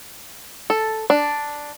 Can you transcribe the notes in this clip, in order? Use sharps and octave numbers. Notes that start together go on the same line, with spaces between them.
A4
D4